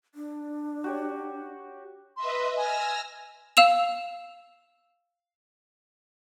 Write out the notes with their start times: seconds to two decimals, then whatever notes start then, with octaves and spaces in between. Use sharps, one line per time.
0.15 D4
0.84 F#4 G4 C#5
2.17 B4 D#5 E5 C6
2.57 G#5 E6 F6 A#6
3.57 F5 E6 E7 F7